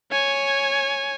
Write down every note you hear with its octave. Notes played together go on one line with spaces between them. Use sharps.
C#5 G#5